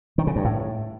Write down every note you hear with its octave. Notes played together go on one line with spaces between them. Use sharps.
D#3
C#3
G2
A2